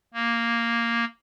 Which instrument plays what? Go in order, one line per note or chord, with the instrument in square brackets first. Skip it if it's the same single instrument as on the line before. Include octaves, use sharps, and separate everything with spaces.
[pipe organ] A#3